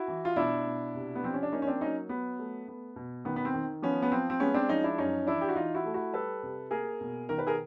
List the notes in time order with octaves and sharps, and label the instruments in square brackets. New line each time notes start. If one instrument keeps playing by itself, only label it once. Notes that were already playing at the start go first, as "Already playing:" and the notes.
Already playing: [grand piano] E4 F#4
E3
F4
B2 D4 E4
B2
C3
B3
F3 C4
C#4
D4
A#3 C#4 D#4
C#4
C4 D4
F#3 C#4 D#4
F#3 B3
A3
B3
B2
D#3 B3
B3
C4
D#3
F3 B3 C#4
B3
F3 C4
C4
G#3 B3 C#4
C4 D4
F3 C#4 D#4
D4 E4
F#2 C#4 D#4
E3 D4 E4
G4
F#4
E3 D#4 F4
E4 F#4
A3
E4 F#4
G3 A4 B4
C3
A#3 G#4 A#4
B2
D#3 A#4
B4
G#4 A#4